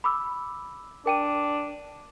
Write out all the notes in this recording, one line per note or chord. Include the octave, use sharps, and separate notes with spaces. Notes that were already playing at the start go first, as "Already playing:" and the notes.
B5 D6 E6
D4 A#4 G5 D#7